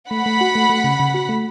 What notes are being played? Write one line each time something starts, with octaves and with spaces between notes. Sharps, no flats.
A3 F#5 B5
A3
F#4
A3
A3
C#3
C#3
F#4
A3